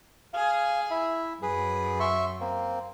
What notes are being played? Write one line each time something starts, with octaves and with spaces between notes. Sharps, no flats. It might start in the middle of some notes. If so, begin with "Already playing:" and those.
G#4 F5
E4 E5
F#2 G#4 B4
E5 C6 C#6
A#3 C4